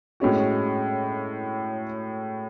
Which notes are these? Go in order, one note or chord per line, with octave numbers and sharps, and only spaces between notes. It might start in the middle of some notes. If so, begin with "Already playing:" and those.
A2 G#3 C#4 F#4